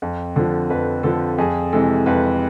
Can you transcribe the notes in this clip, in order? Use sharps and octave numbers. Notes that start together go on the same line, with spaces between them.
F2
D3 F3
F2 B4
D3 F3 A4
F2 G#4
C3 E3 G#3 A4
F2 B4